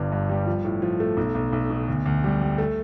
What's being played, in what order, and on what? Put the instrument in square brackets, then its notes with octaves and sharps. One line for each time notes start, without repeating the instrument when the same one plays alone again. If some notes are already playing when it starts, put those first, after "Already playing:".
Already playing: [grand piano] G1 G2
G2
G3
F3
A2
F3
A3
B1
B1
B1
B2
D2
D2
G3
G3
A3